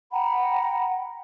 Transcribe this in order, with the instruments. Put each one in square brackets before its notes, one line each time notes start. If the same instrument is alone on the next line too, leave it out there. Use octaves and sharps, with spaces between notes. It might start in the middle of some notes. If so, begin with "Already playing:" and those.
[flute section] F#5 G5 A#5 B5